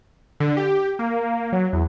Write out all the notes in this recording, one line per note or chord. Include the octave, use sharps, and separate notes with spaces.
D3
G4
A#3
F#3
E2